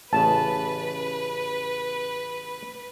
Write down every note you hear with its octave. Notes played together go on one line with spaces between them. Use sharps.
A1 C#3 B4 A5